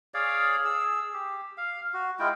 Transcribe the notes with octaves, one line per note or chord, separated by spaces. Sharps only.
G#4 C#5 D5 F5
G#4 E6
G4
F5
F#4
G#3 E4 F4 G5